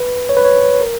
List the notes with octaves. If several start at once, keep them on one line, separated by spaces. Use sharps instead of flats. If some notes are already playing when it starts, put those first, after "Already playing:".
Already playing: B4
C#5
B4
C#5
A#4